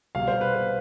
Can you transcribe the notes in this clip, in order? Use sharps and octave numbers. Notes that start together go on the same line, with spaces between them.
C2 B2 F5
C5
B4
B4